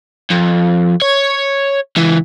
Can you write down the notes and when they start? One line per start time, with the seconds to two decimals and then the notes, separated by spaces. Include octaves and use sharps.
0.30 F2
1.02 C#5
1.96 C#2 E3